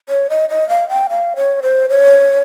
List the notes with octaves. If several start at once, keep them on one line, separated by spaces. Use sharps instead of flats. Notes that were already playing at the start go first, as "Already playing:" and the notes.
C#5
D#5
D#5
F5
G5
F5
C#5
C5
C#5